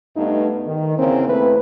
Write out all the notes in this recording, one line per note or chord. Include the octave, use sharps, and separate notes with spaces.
G2 A3 B3 D#4
D#3
E2 C#3 A#3 C4
E2 A3 C4 E4 B4